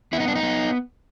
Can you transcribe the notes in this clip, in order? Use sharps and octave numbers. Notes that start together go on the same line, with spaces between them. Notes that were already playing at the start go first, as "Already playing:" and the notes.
B3 E4
D#4
D4
D#4
B3